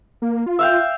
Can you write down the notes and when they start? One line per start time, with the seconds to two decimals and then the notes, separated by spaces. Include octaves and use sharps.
0.22 A#3
0.46 F4
0.59 E5 F5 G5